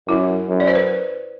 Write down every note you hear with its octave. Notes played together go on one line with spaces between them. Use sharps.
F#2 E4
F#2
D5
C5
B4